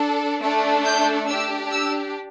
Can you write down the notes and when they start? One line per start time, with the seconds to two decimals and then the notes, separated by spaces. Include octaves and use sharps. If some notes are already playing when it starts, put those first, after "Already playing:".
Already playing: D4 A4
0.42 A3 D4 A4
0.85 G6
1.27 D4 G4 E6
1.71 E6